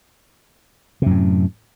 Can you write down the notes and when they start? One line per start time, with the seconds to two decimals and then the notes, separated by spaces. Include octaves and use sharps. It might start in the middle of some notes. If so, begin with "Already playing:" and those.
1.02 C3
1.06 F#2
1.11 A2